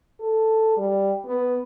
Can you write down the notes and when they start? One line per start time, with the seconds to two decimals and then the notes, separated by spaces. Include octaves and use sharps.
0.20 A4
0.77 G3
1.26 B3